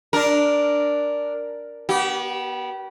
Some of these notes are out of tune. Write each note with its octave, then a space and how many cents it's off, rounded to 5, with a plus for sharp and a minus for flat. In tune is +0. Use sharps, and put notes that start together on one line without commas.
D4 +0 A#4 +0
B3 -25 G4 -40